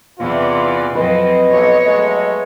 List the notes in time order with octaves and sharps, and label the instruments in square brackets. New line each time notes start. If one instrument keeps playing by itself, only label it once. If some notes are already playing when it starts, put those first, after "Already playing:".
[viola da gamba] E2 C3 D5 [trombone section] E3 F4
[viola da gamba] F2 F#3 C4 [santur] B4 [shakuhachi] D#5
[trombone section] B1 F#3 [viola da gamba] B3 C#5
[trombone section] F#3 G#3 A3